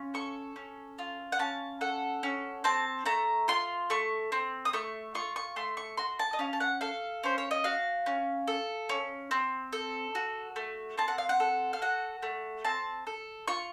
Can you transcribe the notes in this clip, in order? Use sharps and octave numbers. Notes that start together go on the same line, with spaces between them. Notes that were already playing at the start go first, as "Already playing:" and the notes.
Already playing: C#4 F4
A4 C#6
C#4
F4
F#5
C#4 A5
A4 F#5
C#4
C4 A5
A3 A#5
F4 C6
A3 C#6
C4
D#6
A3 C#6
F4 C#6
C#6
A3 C6
C#6
F#4 C6
A5
D#5
C#4 F5
A5
F#5
A4 F5
C#4 C5
C#5
D#5
F#4 F5
C#4
A4
C#4
C4
A4
F#4
A3
C4 A5
F#5
F5
F#5
A4
F5
F#4 F#5
A3
C4 A5
A4
F4 C#6